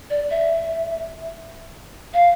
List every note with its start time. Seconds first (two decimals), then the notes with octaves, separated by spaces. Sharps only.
0.10 D5
0.31 E5
2.14 F5